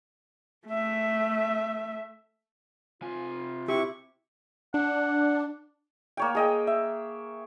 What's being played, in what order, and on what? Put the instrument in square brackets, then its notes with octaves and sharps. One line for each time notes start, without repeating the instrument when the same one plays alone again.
[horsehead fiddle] A3 E5
[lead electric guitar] C3 G#5 [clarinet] F4
[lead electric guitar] C3 [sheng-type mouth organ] E4 C#6 [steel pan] G4
[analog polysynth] D4 [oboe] F#5
[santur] A#3 C#5 G5
G#4 D#5 G5
E5